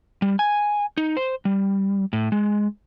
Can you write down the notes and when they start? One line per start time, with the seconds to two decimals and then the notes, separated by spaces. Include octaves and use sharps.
0.22 G3
0.39 G#5
0.97 D#4
1.17 C5
1.45 G3
2.13 A2
2.32 G#3